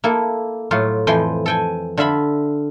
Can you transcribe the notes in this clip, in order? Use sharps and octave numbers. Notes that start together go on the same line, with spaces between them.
A#3 E4 A4
A2 F#3 F4
F2 E3 F3 G5 C6
A4 G5 G#5
D3 F4 E5 B5